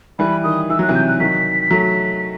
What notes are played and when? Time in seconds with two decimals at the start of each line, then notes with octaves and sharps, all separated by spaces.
0.19 E3 G3 B5
0.44 D#3 D#6
0.70 E3 E6
0.79 F#3 F#6
0.89 C3 E3
0.95 G6
1.07 F#6
1.20 D#3 F#3 B6
1.71 F#3 A3